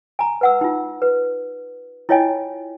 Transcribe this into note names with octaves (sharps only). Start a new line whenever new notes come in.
G#5 A#5
B4 F#5 E6
D#4 F4
B4
E4 F4 C#5 D#5 G5 G#5